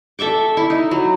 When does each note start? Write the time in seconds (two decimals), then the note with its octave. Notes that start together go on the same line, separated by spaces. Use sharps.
0.19 A4 E5 C#6 D6
0.57 E4
0.70 D#4
0.91 F#3